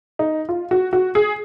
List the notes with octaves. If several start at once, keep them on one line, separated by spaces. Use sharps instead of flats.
D#4
F4
F#4
F#4
G#4